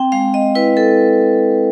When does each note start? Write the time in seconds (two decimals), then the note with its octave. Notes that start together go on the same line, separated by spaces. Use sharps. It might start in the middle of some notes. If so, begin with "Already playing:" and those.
Already playing: C4 G5
0.12 G#3 F5
0.34 D#5
0.55 E4 B4
0.77 A4